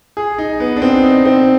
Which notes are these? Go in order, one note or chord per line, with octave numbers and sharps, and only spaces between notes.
G#4
D#4
B3
D4
C4
D#4
C4